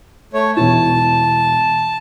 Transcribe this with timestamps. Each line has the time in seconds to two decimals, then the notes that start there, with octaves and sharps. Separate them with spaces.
0.33 A3 C#5
0.56 E1 B2 E4 A5